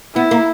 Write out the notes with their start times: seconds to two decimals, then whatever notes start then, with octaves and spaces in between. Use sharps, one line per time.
0.16 B3 E4
0.31 A#3